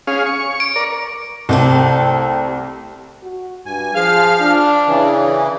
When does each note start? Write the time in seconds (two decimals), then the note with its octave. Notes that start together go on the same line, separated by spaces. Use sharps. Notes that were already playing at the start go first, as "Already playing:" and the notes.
0.07 C#4 G#4 F5
0.26 C#6
0.60 D7
0.76 A#4 D5
1.49 C2 A3 C4 G4
3.23 F#4
3.66 G2 G#5
3.95 F3 G#4 F5 F6
4.41 D4
4.87 C#3 E3